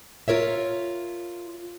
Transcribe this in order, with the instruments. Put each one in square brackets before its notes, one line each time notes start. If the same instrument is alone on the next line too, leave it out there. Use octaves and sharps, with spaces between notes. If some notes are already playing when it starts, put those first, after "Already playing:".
[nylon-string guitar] F4 A#4 C#5 E5